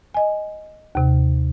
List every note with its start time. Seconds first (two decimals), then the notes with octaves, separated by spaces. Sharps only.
0.14 D#5 G#5
0.95 D#2 C3